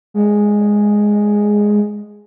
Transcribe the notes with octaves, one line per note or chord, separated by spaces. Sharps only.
G#3